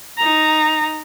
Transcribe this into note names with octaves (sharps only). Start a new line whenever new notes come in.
D#4 A#5